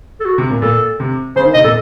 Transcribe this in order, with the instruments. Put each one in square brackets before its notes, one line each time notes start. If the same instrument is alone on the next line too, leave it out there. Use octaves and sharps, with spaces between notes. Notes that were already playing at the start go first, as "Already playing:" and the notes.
[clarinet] A4
F#4
[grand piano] C3
A#2
[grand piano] A#2 [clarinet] A4
[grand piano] C3
[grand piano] C#3 [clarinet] C5
[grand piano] D#3
[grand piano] C3 [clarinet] D#5
[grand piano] A#2 [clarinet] A4